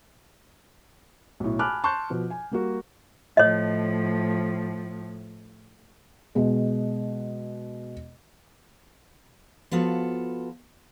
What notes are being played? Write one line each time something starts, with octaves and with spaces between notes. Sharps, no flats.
B1 A2
G#5 A5 B5 D6 F6 F#6
A5 C6 C#6 F#6 G6
B2 F3
G#5
G3 A#3 F#4
A2 F3 C#5 D#5
B2 G#3
F3 B3 F4 F#4 A4